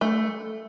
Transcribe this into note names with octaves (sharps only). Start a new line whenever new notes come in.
A3